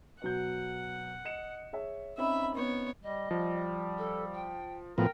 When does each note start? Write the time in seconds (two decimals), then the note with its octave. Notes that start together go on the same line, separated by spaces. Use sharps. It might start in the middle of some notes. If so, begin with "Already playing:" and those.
0.22 B2 F#3 F#5 G6
1.25 D#5 C#7 E7
1.73 G#4 C#5 E5
2.18 C4 C#4 D#4 E5 B5
2.55 B3 C#5
3.03 G3 D#5
3.31 F3 G3
3.98 A4
4.33 G5
4.98 A2 F3 B3 A#4 G5